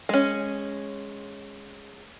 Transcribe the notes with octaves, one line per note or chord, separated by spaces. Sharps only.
G#3 C#4